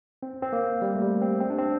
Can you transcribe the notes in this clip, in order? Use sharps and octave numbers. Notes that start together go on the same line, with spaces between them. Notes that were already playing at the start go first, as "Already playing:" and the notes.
C4
C4
A#3
G3
A3
G3
C4
C4
D4
C4